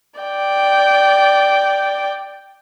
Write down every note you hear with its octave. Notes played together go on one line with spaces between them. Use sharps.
D5 G5